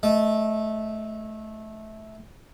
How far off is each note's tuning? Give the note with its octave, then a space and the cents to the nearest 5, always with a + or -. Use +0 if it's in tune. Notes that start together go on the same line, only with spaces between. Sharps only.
A3 -15 D#5 +0